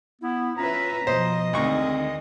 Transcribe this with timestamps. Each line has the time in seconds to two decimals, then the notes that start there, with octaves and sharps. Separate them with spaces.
0.21 B3 E4
0.57 C#4 F4 B4 E5 A#5
1.07 B2 F3 C5 D#5
1.53 D2 D#3 G#3 C4 C#6